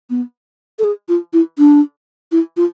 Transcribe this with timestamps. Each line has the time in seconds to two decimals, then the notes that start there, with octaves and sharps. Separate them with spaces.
0.10 B3
0.79 A4
0.84 G#4
1.09 F4
1.33 E4
1.58 D4
2.32 E4
2.57 F4